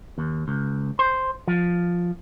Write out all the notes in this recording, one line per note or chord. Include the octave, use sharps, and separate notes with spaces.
D#2
C#2
C5
F3